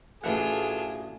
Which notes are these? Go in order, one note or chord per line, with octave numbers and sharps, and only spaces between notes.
A1 E3 D4 F4 F#4 G#4 A4 F#5